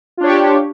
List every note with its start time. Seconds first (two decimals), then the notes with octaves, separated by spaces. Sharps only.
0.17 F4
0.20 D4
0.23 C#5
0.26 G4